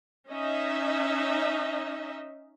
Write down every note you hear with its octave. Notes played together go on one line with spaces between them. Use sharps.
C#4 D#4 D#5 E5